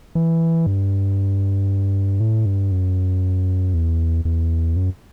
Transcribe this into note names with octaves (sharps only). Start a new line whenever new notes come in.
E3
G2
A2
G2
F#2
E2
E2
F#2